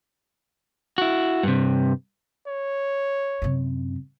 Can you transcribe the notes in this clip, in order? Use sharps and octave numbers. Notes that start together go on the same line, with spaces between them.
E4 F#4
G2 C3
C#5
F#2 C3